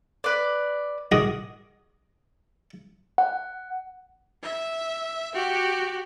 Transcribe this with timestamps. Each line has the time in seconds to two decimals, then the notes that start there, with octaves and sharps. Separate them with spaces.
0.24 B4 D5
1.12 D#4 F#4 G#4 A#4 D6 D#6
3.18 F#5
4.43 E5
5.34 F#4 G4